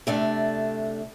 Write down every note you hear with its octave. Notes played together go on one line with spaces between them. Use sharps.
C3 A3 D4